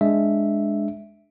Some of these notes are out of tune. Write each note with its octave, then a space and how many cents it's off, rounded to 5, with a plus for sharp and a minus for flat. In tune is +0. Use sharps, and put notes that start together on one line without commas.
G#3 +0 D4 +0 E5 +0